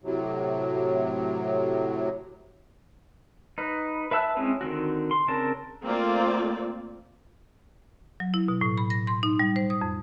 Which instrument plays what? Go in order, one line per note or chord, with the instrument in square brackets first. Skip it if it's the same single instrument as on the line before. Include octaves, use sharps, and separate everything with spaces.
[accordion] A2 C3 F#3
[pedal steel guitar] D#4 B4
B4 E5 A5 E6 F#6
G#3 C4 C#4 E4 G#4
D3 D#3 C4 F#4
C6
C#3 C4 D4 A#4 A5
[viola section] A3 A#3 C4 F4 D5
[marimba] F#3
E4
B2
A2
B5
A#6
C6
D#4
G3
C5
D#6
F2